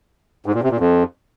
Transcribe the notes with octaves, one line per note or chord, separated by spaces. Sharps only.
G#2
A#2
C3
A#2
F2